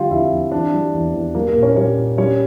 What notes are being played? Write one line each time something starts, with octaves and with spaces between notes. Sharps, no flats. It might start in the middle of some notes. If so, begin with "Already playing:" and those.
Already playing: D3 G3 F4 G4 F5 G5
F2 E4 E5
F2
E3 D4 D5
G3
E2
E2
G3 A#3 A#4
A#3 A#4
A#2
C#4 C#5
G3 C#4 C#5
A#2
G3 C#4 C#5